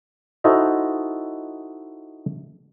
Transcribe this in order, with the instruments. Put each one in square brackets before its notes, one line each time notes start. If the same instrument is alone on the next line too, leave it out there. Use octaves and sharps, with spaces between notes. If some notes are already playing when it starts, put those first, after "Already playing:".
[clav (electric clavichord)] D#4 E4 F#4 A4 C5 D#5